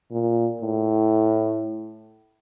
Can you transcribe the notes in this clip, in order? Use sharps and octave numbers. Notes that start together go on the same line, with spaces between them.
A#2
A2